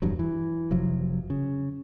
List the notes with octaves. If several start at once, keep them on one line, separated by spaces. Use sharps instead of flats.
D#1 E2 G2 F#3
E3
F1 C3 F3 F#3
C#3